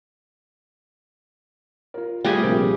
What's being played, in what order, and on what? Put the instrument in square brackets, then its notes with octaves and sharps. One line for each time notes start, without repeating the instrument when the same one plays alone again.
[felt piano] F4 A#4
[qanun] G3 G4 G#4 [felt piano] A3 F4
[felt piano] A#1 C3 A#3